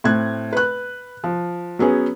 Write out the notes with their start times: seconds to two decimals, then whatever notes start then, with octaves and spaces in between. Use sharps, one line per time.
0.04 A2 C4 F#6 G#6
0.53 B4 F#6
1.24 F3
1.79 F#3 B3 C#4 G#4